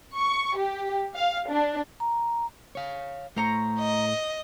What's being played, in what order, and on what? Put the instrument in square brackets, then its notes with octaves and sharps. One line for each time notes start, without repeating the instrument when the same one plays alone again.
[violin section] C#6
G4
F5
D4
[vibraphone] A#5
[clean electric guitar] C#5 F5
[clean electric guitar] A2 A3 [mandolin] C5 A#5 C#6
[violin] D#5